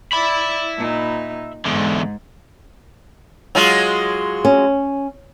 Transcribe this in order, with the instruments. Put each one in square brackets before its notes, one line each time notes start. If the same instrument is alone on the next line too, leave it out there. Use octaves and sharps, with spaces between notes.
[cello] D5 [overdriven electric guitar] E5 B5
[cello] A#2 D#4
[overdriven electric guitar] E2 D3 [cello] G#2
[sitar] F#3 G#3 F4
[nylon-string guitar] C#4